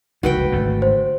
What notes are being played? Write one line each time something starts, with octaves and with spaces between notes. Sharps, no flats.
F1 C#2 G3 F#4 B4 G5
G#1 D3 A3
C5